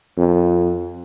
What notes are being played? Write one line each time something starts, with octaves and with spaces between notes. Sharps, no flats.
F2